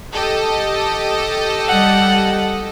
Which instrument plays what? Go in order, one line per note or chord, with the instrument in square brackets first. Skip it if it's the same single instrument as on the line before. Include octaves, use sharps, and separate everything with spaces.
[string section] G4 A4 D#5
[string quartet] G3 F#5